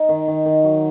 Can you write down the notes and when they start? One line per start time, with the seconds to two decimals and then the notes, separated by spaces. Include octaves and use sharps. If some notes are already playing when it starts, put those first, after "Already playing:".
Already playing: D#4
0.09 D#3
0.28 D#3
0.46 D#3
0.64 F#3